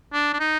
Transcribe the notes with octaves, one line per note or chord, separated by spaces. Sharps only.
D4
D4
D#4